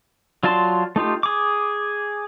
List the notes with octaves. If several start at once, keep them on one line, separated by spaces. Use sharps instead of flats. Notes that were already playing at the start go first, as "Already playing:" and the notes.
F#3 F4 D5 A5 C6
A3 D#4 F4 G4
G#4 D6